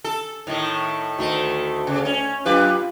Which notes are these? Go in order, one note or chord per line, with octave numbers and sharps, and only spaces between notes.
A4
A2 D#3 A3
D2 D#3 A3
C#3
C#4
F#2 F4 G4 B4